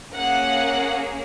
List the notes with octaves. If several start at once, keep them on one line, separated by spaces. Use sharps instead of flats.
A#3 C#4 G#4 F#5